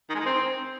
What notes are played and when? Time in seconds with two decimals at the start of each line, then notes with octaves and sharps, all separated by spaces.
0.09 D#3
0.15 G#3
0.20 D#3
0.25 C4